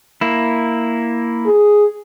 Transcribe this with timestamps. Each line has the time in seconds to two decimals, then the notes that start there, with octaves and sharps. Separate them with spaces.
0.21 A#3 E4
1.46 G#4